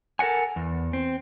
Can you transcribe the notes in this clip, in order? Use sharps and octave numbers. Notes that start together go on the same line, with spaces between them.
A4 A#4 D#5 F#5 G#5
E2
C4